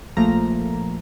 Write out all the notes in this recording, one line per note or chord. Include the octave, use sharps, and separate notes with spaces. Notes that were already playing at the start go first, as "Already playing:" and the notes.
A#1 F3 A3 A#3 A#5